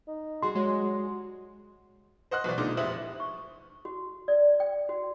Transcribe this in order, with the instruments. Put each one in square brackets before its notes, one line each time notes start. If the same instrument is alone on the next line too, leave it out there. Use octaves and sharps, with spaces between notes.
[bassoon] D#4
[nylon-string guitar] G3 F#4 G#4 [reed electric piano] C6
[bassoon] F#3 [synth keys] G#3
[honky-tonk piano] C5 D#5 F#5 C6 F#6
B1 B2 E3 C5 D5
A#2 D3 G#3 D#4 D6
F1 E4 C5 E5 D#6 F#7
[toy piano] C#6
F#4
D5
G5
F#4